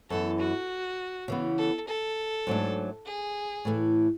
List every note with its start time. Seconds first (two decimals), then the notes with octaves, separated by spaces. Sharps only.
0.10 F#2 E3 B3 A4
0.40 F#4
1.28 C#3 E3 B3
1.58 A4
1.88 A4
2.47 G#2 F#3 A3 D4
3.06 G#4
3.65 A2 E3 A3